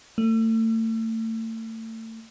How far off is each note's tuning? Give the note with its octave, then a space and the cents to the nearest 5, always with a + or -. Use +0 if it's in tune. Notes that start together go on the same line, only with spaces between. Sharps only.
A3 +35